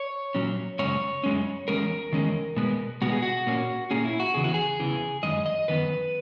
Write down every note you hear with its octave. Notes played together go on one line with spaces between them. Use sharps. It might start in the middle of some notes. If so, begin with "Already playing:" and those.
Already playing: C#5
A#2 F#3 C#4
F#2 C#3 G#3 C#4 C#5
F#2 C#3 G#3 C#4
E2 D#3 G#3 C#4 A#4
E2 D#3 G#3 C#4
B2 G#3 B3
B2 G#3 B3 F#4
G#4
F#4
A#2 A#3 C#4
A#2 A#3 C#4 G#4
E4
F#4
E2 C#3 E3 G#4
F#4
G#4
E2 C#3 E3
F#2 D#3 G#3 D#5
D#5
F#2 D#3 B3 B4